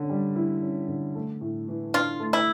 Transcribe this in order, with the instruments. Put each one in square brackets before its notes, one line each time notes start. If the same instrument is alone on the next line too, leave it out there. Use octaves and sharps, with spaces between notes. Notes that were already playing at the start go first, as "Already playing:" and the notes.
Already playing: [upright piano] D3 C#4
G3
E4
C#4
D3
A3
A2
E3
[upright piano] D4 [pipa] F4
[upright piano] A3
[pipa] E4